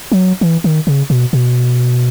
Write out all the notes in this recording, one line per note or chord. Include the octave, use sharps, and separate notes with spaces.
F#3
E3
D#3
C#3
B2
B2